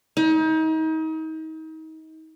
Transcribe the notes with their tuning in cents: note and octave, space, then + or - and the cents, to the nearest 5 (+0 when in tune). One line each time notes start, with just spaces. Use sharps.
D#4 +35